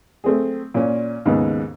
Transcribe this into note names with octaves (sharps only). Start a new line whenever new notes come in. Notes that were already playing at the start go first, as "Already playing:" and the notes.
A3 C4 G#4
A#2 C#4
D#2 G#2 C#3 B3